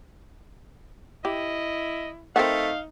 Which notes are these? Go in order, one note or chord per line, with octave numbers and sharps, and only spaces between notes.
E4 G4 D#5
A3 C4 D#4 A#4 F5 F#5